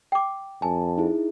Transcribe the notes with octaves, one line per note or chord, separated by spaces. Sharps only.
G5 D6
F2 G#5 A5
D#4 E4 G#4